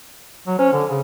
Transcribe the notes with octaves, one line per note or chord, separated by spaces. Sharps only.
F#3
C#4 C5
D3
C#3